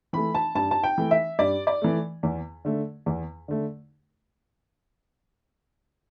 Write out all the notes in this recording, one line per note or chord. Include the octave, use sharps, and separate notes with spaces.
E3 A3 B5
A5
G2 A5
A5
G5
E3 A3
E5
G2 D5
D5
E3 A3
E2
D3 A3
E2
D3 A3